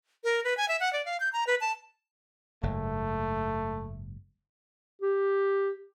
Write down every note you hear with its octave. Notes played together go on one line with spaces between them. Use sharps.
A#4
B4
G#5
E5
F#5
D5
F5
G6
A#5
B4
A5
F#1 G#2 A3
G4